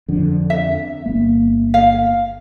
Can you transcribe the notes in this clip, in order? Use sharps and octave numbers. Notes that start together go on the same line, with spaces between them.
F2 D3
E5
G1 A#3
F5